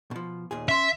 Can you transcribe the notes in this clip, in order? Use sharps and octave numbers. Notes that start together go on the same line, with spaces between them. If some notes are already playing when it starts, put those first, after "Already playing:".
B2 F3
D#2 A#2 G#4
C#4 E5 C6